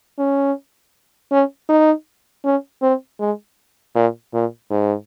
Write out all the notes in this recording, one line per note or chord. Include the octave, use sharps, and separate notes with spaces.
C#4
C#4
D#4
C#4
C4
G#3
A#2
A#2
G#2